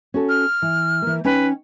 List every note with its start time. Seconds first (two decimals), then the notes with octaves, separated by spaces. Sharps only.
0.14 C#4 F#4 A4
0.29 F6
0.62 E3
1.02 E3 A#3
1.25 C#4 D#4 B4 G5